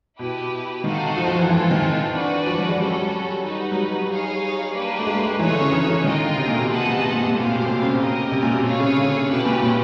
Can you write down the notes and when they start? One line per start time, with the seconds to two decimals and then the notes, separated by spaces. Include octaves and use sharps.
0.19 B2 E4 G4 B4
0.84 D#3 D#4 F#4 A4 C5 F5
1.17 F3
1.27 F3
1.39 E3
1.49 E3 C4 F4 A4
1.60 E3
1.71 D#3
1.82 E3
2.14 D4 F#4 B4 D5
2.47 F3
2.58 F#3
2.69 G#3
2.79 G3 C#4 F#4 A4
2.90 F#3
3.01 G3
3.44 D#4 F#4 B4
3.71 F#3
3.77 G3
4.09 D#4 G#4 C#5 F5 G#5
4.74 A#3 D4 G4 B4
4.99 A3
5.06 G#3
5.18 A3
5.28 G#3
5.39 E3 D#4 G#4 C#5 E5
5.51 D3
5.60 C#3
5.72 E3
5.87 E3
6.04 D#3 F4 A#4 D#5 G5
6.20 D3
6.37 C3
6.48 A#2
6.58 B2
6.69 C3 G#4 B4 D#5 F#5 A5
6.85 A#2
7.02 A#2
7.12 A#2
7.23 A#2
7.34 A2 G4 C5 F5
7.45 A#2
7.56 B2
7.67 C3
7.82 C#3
8.00 G4 A#4 D#5
8.32 C3
8.42 A#2
8.53 B2
8.64 C3 G#4 C#5 F5
8.80 C#3
8.96 D3
9.29 B2 C#4 E4 G4 B4
9.45 A#2
9.62 A#2